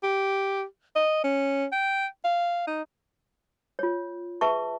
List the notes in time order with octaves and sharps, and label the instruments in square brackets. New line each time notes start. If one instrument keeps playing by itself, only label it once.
[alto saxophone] G4
D#5
C#4
G5
F5
D#4
[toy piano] F4 C#5
G#4 B4 E5 A5 C#6